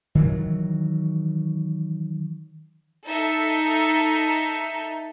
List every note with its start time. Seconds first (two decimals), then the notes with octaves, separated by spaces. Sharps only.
0.15 D#3 E3 F#3
3.06 D#4 A4 E5